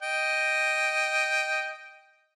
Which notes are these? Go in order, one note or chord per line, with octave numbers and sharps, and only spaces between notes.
D#5 G5